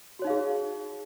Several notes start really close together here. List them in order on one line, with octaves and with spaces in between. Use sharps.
F#4 C#5 D#4 F5 G#4